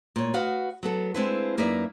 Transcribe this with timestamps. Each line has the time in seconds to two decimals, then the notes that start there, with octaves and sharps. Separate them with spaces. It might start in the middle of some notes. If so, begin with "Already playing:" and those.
0.16 A#2 C#5
0.34 F#4 B4 D#5 F5 F#5
0.83 F#3 B3 A4
1.14 G#3 C4 D4 E4 F4 B4
1.57 F#2 A#3 D#4 B4 D5 E5